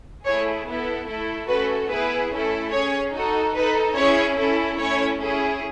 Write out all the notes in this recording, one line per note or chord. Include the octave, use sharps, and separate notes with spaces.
A3 E4 G#4 C#5
B3 E4 A4
A3 E4 A4
A3 C#4 F#4 A4 B4
B3 E4 G#4 B4
A3 C#4 E4 A4
C#4 G#4 C#5
D#4 F#4 A4
D#4 A4 B4
C#4 E4 G#4 C#5
C#4 E4 A4
A3 C#4 E4 C#5
C#4 E4 G#4